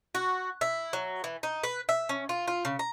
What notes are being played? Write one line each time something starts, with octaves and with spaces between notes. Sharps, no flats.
F#4
E4
F#3
E3
D#4
B4
E5
C#4
F4
F4
C#3
A#5